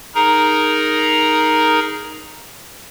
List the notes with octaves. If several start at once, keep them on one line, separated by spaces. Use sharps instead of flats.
D#4 G#4 A#4 A#5